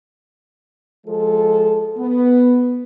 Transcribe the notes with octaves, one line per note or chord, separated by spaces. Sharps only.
F3 G#3 A4
B3